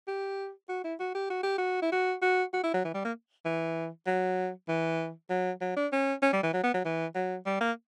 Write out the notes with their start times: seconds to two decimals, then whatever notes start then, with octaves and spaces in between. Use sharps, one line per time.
0.08 G4
0.69 F#4
0.84 E4
1.00 F#4
1.15 G4
1.30 F#4
1.43 G4
1.58 F#4
1.82 E4
1.92 F#4
2.22 F#4
2.53 F#4
2.64 E4
2.74 F#3
2.85 E3
2.94 G3
3.05 A#3
3.45 E3
4.07 F#3
4.68 E3
5.30 F#3
5.61 F#3
5.77 D4
5.92 C#4
6.22 C#4
6.33 G3
6.43 E3
6.53 F#3
6.63 B3
6.74 F#3
6.85 E3
7.15 F#3
7.46 G3
7.61 A#3